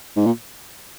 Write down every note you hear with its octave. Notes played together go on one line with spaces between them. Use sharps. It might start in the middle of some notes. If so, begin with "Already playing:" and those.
G#2
A#2